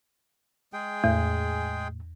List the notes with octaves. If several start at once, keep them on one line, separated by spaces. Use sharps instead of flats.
G#3 G#4 G5
E2 A2